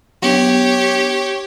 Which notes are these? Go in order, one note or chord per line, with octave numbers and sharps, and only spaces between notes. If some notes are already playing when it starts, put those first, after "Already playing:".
F#3 B3 D4 G4 C#5